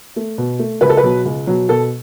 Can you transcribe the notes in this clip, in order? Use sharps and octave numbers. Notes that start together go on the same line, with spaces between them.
A3
B2
A3
C#2 B4
A4
B4
B2 F#3
C#2
B2 F#3
B2 A4